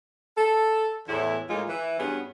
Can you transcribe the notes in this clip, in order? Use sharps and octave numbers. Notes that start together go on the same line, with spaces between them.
A4
E2 A2 E4
A2 G#3 A#3 D#4 F4 G#4
E3
G2 B3 C#4 F#4 G#4